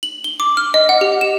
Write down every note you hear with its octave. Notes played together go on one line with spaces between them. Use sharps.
F#7
G7
D6
F6
D#5
F#5
G4
E7